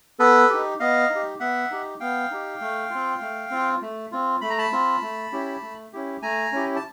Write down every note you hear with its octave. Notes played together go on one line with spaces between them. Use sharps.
B3 A4 B4
D#4 G4
B3 D#5 F5
D#4
G4
B3 E5 F#5
D#4 G4
B3 F5 G5
D#4 G4
A3
C4 F4
A3
C4 F4
A3
C4 F4
A3 B5
A#5
A5 B5
C4 F4
A3
C#4 E4 G4
A3
C#4 E4 G4
A3 G#5 A#5
C#4 E4 G4
A5